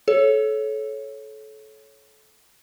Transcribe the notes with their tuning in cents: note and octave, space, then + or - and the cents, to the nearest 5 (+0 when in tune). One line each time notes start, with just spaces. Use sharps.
A4 -25 C#5 -5